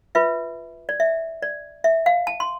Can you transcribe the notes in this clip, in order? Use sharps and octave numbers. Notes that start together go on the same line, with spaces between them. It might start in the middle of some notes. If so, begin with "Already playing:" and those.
F4 B4 E5
D5
E5
D5
E5
F5
A5
C6